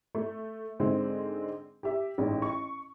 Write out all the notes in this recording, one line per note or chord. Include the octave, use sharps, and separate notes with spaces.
A3
G#2 D3 G#3 C4
G4 E5
A1 G#2
C#6